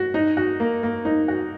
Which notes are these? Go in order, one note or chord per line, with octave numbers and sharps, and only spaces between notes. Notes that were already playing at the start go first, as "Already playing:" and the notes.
Already playing: F#4
D#4
F#4
A#3
A#3
D#4
F#4